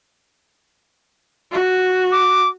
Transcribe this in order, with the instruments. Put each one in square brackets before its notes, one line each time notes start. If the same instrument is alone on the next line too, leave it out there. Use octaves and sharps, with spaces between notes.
[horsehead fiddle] F#4
[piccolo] D6